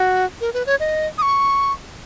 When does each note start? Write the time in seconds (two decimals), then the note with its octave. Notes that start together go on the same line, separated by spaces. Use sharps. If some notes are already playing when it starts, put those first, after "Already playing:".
Already playing: F#4
0.41 A#4
0.54 B4
0.66 C#5
0.80 D#5
1.18 D#6
1.22 C#6